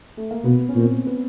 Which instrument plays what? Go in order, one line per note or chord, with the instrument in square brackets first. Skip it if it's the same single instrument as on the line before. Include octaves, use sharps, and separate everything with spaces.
[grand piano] A3
A#3
[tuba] B2 [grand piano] B3
[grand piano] C#4
[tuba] A#2 [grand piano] C4
[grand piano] B3